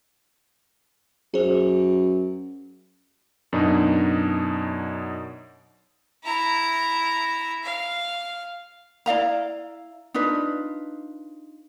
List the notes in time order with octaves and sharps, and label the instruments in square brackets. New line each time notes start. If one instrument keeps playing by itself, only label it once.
[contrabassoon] F#2 [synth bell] G#4 C5
[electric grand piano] F#2 B2 D4 D#4
[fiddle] E4 A#5
F5
[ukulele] E4 D5 F5 A#5
D4 D#4 F4 B4